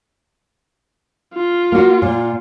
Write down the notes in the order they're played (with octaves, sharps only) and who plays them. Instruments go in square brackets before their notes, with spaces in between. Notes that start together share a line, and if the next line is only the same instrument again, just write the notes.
[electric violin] F4
[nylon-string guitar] A#3 F#4
A#2